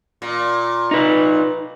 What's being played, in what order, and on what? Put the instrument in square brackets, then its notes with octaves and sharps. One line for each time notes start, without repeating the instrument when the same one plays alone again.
[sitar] A#2
[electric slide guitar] D#4 B4